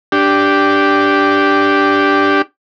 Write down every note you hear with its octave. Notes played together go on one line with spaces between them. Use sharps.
D4 G4